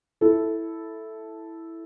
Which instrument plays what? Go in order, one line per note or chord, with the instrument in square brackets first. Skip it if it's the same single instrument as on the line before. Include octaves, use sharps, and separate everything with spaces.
[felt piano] E4 A4